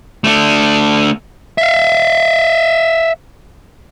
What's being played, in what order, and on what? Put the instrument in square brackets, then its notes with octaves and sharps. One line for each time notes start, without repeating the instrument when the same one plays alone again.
[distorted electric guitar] A3 D4
[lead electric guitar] E5 F5